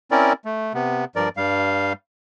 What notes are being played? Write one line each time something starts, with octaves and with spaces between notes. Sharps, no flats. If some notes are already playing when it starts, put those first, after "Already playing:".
C4 C#4 E4 A#4 D5
A3
C3 B3
G2 F3 A#4 D5
G2 G3 F5